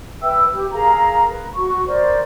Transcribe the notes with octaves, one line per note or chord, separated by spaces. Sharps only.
B4 E5 G5 E6
G4
G#4 A#4 F5 A#5
B4
F#4 C#6
A#4 C5 D5